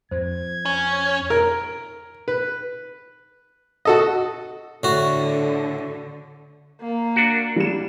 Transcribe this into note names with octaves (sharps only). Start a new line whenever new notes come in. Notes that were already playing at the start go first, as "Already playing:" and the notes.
F2 C5 G#6
C#4
A#4
B4
F#4 A4 D#5
A2 D3 F#4
A#3
D4 F#4
G3 E7